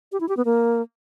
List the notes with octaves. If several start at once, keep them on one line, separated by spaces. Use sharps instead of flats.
G4
E4
G4
B3
A#3